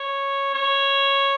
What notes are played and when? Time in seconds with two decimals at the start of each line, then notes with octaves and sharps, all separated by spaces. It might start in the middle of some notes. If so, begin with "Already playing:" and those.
Already playing: C#5
0.53 C#5